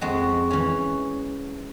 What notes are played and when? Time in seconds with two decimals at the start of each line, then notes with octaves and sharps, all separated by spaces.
0.01 F2 G#3 F#4
0.51 E3 C#4